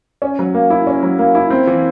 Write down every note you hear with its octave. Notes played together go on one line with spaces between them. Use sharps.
C#4
F#3
A#3
E4
C#4
F#3
A#3
E4
C4
E3